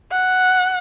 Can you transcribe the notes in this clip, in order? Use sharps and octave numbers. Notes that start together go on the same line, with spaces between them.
F#5